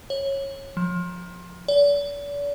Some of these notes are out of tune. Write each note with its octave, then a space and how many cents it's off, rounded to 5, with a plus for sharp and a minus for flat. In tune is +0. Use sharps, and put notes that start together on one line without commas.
C#5 -15
F3 +25
D5 -40